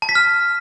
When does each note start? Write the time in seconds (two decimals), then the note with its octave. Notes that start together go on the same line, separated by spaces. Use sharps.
0.02 A5
0.09 B6
0.15 F6